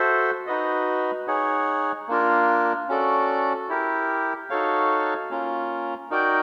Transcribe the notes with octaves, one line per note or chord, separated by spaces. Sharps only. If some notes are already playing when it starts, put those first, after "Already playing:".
Already playing: F#4 A4 C5 E5
D#4 F#4 B4 D#5
D#4 G#4 C#5 F#5
A#3 D4 F4 A#4
C#4 F#4 A4 D5
E4 G4 A#4
D#4 F#4 A4 C#5 F5
A#3 C#4 F4
D#4 F#4 A#4 D5 G5